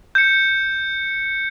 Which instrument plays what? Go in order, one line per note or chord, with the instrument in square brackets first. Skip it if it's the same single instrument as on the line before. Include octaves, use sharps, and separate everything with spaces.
[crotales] G6 C#7